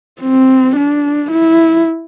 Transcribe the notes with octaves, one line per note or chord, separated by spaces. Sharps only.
C4
D4
E4